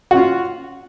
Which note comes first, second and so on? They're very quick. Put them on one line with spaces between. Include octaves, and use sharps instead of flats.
F#4 C#4 F4